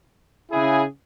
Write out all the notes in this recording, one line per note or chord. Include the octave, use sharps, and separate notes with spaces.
C#3 E4 G#4